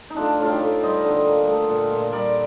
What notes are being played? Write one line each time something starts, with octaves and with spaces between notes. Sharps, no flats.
D#4
A3 D4 F4
A2 F4
D#4 G4
A2
G3 C5 D#5
D3
A#3
A3
A#2
A#2
G3 A#4 D5